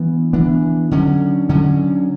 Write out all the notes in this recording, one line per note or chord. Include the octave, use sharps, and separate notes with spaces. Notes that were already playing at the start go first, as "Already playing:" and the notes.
Already playing: E3 B3 D4
E3 B3 D4
D3 F#3 C#4
D3 F#3 C#4